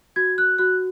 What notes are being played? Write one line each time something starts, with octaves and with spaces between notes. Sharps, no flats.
F#4 G#6
F#6
F#4 F#6